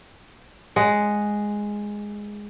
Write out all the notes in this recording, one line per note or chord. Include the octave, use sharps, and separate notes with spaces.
G#3 F#5